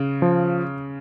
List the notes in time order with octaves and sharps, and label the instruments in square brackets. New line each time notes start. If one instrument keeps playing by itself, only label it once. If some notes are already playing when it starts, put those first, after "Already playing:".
Already playing: [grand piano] C#3
[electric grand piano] F3